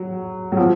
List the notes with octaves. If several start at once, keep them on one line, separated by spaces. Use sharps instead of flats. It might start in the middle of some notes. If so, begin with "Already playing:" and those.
Already playing: F#3
F#3
F3